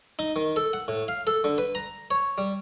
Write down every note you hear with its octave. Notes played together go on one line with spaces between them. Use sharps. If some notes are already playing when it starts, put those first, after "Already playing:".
D#4
D#3
A4
F#5
A2
F5
A4
D3
B4
A#5
C#5
G3